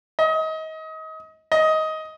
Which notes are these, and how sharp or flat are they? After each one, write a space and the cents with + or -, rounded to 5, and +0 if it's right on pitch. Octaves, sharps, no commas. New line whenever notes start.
D#5 +30
D#5 +15